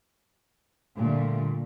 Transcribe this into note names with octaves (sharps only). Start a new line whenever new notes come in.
A#2 D3 G3 A3